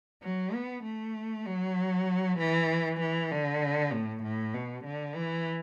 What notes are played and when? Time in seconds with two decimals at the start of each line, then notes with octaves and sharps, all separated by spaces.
0.23 F#3
0.54 B3
0.84 A3
1.46 F#3
2.39 E3
3.00 E3
3.31 D3
3.93 A2
4.23 A2
4.54 B2
4.85 D3
5.16 E3